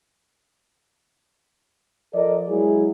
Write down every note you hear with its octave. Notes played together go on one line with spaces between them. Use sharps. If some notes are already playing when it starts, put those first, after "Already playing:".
F3 A4 A#4 D5 D#5
F#3 G#3 E4 G#4